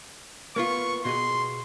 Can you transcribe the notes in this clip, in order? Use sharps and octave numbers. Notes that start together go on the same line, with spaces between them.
A#3 B3 F4 C#6
B2 F#4 G#4 C6